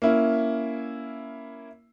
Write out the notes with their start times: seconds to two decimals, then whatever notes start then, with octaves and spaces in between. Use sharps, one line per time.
0.02 A#3 C#4 E4